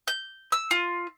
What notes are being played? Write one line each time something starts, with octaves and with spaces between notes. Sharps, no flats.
G6
E6
F4